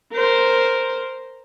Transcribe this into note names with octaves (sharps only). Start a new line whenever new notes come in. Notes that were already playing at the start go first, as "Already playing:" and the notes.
A#4 C5